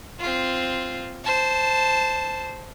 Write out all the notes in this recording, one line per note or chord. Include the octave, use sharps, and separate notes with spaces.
C4 F4
C5 A5